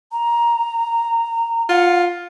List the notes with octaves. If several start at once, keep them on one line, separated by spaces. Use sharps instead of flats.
A#5
F4 F#5